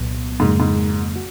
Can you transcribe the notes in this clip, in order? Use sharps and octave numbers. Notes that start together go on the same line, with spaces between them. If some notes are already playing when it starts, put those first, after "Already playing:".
Already playing: C2 A#2 F#3 B3
F2 G#2 C#3 F#3 A#3
G#2
F#4